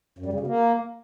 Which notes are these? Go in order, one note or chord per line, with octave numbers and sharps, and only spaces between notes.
F#2
G3
C#3
B2
A#3